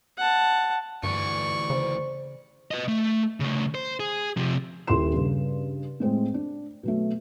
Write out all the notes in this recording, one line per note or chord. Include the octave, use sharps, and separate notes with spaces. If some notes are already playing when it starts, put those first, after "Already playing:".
F#5 A5
D2 G2 E3 D5 C#6
C#3 C5
B4 D#5
A3
C#3 A3
C5
G#4
C3 F3
D#1 E4 G4 C6 E7
G2 C#3
A2 G#3 C4
D4
B2 F#3 A3